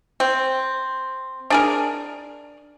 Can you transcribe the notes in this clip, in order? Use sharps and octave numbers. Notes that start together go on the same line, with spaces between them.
C4
D4 G#4 A#4